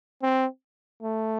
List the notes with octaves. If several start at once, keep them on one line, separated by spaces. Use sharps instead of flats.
C4
A3